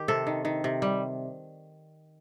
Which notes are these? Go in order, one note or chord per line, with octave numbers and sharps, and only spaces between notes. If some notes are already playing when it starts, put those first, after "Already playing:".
Already playing: D#3 G4
C3 A4
D#3
D#3
C3
G3